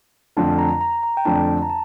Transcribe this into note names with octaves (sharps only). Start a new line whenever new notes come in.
F2 D3 A3 D4 F4 A5
A#5
A#5
A#5
G5
F2 D3 A3 D4 F4 A5
A#5
A5